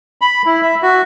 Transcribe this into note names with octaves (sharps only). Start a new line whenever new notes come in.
B5
E4
E5
F#4